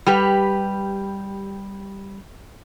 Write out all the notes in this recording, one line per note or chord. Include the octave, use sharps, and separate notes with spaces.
G3 G4 B4